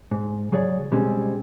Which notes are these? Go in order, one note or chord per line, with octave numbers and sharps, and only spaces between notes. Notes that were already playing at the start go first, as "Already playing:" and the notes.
G#2
C#3 F#3 G#4 C#5 D5
B2 G3 G#3 C4 C#4 G#4